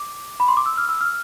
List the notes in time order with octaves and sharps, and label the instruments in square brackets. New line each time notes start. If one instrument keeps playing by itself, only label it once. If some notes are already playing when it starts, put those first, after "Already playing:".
Already playing: [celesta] D6
B5
C6
D6
E6
F6
E6
F6